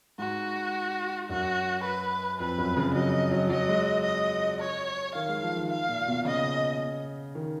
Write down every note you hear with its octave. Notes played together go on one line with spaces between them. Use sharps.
G#2 F#4
F#2 F#4
B4
F2 B4
F#2
C#3
F#3 D#5
F#3
F#3 D#5
G#3
D#5
C#5
D#3 F5
G#3
F3
D#3
F5
A#2
B2
C#3 D#5
D#3